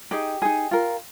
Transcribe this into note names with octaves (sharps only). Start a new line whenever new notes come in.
D#4 G4 G#4 G5
D#4 G#4
F4 A#4